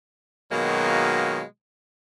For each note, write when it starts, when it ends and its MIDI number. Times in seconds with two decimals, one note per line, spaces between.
0.52 1.42 47
0.52 1.42 51
0.52 1.42 54
0.52 1.42 56
0.52 1.42 58
0.52 1.42 65